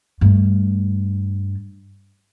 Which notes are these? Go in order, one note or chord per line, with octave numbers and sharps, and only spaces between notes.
G2 A3